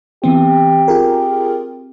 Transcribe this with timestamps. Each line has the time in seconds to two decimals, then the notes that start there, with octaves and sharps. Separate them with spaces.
0.24 E3 B3 C4 G4
0.88 F4 G#4 A#4